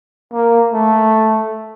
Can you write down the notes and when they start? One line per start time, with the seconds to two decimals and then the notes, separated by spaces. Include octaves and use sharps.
0.32 A#3
0.73 A3